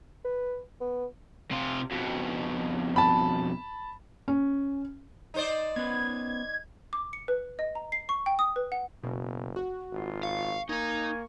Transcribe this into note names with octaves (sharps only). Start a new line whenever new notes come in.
B4
B3
C3 F4
F2 B2
A5 B5
C#4
D#4 C5 D5
B3 C#4 B4 G#6
D6
C#7
B4
D#5
A#5
C7
C#6
G5
D#6
B4
F#5
F#1 B2
F#4
G#1 F4
F5 C#6
A#3 D#4 G#5 A#5